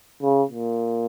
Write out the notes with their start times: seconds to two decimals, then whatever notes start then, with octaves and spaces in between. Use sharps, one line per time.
0.22 C#3
0.51 A#2